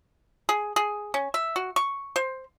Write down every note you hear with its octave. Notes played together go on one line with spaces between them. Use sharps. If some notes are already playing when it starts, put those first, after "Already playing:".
G#4
G#4
C#4
E5
F#4
C#6
C5